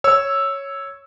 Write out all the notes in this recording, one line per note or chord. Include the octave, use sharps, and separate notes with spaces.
C#5 E6